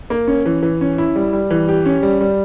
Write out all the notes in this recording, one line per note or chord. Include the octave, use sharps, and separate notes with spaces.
A#3
C#4
E3
E3
C#4
E4
G3
G3
E3
G4
C#4
G3
G3